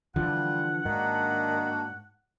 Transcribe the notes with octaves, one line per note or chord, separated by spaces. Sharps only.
D3 E3 F3 G3 F4 F#5
G#2 D#3 A#3 D4 F#4